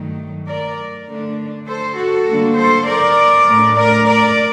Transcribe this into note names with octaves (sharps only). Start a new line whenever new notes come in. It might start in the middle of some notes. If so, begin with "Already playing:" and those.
Already playing: G2 D#3 F#3 A3
A#4 D5
D3 A3 D4
A4 C5
F#4 A4
D3 G3 A#3 D4
A4 C5
A#4 D5
A2 A3 D4
A#4 D5
A#4 D5